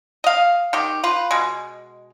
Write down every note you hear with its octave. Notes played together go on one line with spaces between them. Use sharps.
D#5 F5
D#3 G4
F4 B4
B2 G#3